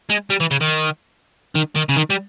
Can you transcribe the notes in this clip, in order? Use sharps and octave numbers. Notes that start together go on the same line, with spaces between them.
G#3
G3
E3
C#3
D#3
D#3
D#3
C#3
D#3
G3